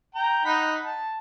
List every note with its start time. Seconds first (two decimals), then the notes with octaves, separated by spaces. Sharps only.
0.15 G5 A#5
0.45 D#4 F#5 B5
0.84 A5